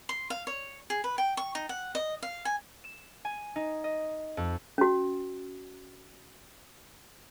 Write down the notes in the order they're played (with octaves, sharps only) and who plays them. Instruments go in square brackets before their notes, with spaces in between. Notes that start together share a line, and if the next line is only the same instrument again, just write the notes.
[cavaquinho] C6
F5
C#5
G#4
B4
G5
C#6
D#4
F#5
D#5
F5
G#5
[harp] E7
G#5
D#4
D#5
F2
[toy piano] C#4 F#4